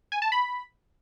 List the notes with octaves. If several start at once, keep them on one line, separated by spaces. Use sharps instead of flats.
G#5
A5
B5